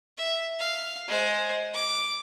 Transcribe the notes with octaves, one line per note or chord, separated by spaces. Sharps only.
E5
F5
G#3 C5
D6